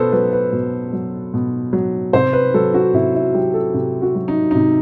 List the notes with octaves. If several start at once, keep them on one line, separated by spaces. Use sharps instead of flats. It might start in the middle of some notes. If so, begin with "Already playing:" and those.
Already playing: B2 A4 B4 C5
F#3 B4
B4
B2
F#3
B2
F#3
C3 C5
B4
F#3 A4
F#4
C3 E4
E4
F#3 G4
A4
C3 G4
F#4
F#3
D#4
C3 D#4